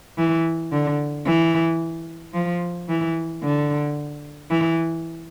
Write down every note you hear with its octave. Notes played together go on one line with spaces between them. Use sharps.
E3
D3
E3
F3
E3
D3
E3